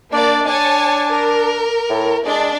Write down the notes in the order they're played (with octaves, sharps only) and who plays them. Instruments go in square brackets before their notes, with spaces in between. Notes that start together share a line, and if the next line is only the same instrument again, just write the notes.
[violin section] A#3 D5 [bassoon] D4
[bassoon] D4 [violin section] C#5 G#5 A5
[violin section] A#4
[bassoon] A2
[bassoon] G#3 [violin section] D4 D5